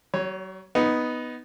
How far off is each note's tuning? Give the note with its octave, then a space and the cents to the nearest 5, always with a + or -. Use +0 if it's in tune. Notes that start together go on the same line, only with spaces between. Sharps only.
F#3 +40 C#5 +0
B3 +0 D#4 +0